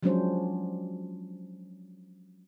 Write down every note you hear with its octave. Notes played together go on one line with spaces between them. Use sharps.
F3 F#3 G#3 C#4 D4 C5